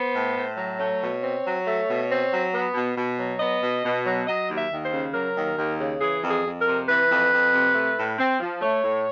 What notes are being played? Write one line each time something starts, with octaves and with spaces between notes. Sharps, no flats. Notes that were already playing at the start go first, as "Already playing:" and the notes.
Already playing: B3 C5
A2
A2
F#3
A3 C#5
B2
C4
F#3
A3
B2
C4
F#3
B3
B2
B2
F#3
B3 D#5
B2
B2
F#3
F#3 D#5
D#2
E5
D#2
C5
C#3
F#3 A#4
D#2
D#2
C#3
E3 G#4
F2
G#4
F2
A#4
C3
E3 B4
F2
F2
C3
A3
A2
C4
F3
A3 C#5
A2